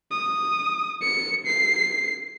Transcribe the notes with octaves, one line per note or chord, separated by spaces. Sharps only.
D#6
C#7
C7